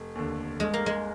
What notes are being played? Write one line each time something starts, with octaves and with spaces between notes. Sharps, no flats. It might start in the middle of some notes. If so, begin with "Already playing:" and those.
Already playing: F1
D#2 D3
G1 G#3
A#3
G#3